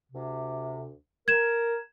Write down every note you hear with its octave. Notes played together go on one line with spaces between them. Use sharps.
D2 C3
A#4 G#6 E7